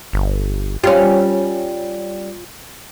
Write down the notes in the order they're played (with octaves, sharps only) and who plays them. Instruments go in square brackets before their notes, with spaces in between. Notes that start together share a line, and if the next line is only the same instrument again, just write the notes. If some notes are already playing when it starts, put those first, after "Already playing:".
[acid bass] G1
[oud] G3 C#4 [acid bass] F4